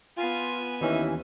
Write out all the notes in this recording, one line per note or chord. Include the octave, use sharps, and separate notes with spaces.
B3 F4 G#5
D#2 E3 C#4 D#4 E5